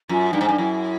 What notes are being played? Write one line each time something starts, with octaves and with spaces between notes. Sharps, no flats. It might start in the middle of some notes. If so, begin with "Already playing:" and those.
F#2 F4
G2 D#4
G#2
G2
F#2 E4